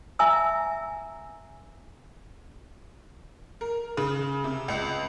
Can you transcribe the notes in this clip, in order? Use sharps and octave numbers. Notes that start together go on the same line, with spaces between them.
E5 G#5 A#5 E6
A#4
C#3
C3
C#2